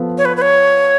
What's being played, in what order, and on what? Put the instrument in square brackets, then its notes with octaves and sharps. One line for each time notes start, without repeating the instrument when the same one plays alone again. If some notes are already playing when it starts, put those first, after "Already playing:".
Already playing: [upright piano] F3 B3 A4
[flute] C#5
B4
B4
C#5